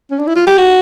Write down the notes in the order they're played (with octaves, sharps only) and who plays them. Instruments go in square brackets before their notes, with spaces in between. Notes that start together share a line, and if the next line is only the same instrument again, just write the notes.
[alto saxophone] C#4
D4
E4
F4
G4
F#4